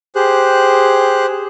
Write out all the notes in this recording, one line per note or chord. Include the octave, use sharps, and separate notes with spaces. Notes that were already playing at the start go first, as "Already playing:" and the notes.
G4 G#4 C5 F#6